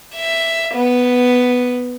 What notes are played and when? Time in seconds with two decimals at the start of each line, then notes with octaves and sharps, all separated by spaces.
0.15 E5
0.75 B3